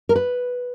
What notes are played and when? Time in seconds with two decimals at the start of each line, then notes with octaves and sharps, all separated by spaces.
0.09 A#4
0.16 B4